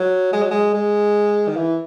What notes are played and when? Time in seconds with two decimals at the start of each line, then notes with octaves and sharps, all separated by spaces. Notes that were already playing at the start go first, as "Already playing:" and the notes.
Already playing: F#3
0.33 G#3
0.42 F#3
0.51 G#3
0.74 G#3
1.48 D#3
1.56 E3